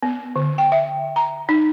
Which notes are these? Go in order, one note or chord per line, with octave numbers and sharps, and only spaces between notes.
B3
D3
G5
E5
A#5
D#4